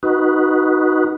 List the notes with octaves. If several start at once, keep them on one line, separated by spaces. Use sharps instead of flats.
D#4 F#4 B4